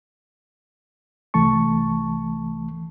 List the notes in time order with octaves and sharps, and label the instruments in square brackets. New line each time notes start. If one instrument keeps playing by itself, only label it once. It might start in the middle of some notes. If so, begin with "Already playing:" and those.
[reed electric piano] C2 E3 A3 A5 C#6